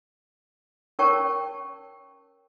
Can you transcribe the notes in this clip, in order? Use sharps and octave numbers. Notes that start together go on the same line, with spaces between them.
C#4 A#4 C#5 G5 A5 C#6